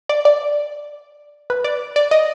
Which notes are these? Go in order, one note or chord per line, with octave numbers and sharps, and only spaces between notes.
D5
D5
B4
D5
D5
D#5